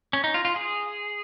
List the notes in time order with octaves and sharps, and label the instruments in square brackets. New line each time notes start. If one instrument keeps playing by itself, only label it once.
[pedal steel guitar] C#4
D#4
F4
F4
G#4